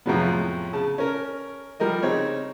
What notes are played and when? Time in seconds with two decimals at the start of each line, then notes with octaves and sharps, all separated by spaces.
0.06 F2 A2 C3 F#3 G#3 B3
0.73 C#3 A5
0.98 C#4 A#4
1.80 F3 G3 A#4 D#5
2.03 C#3 C4 D#4 C#5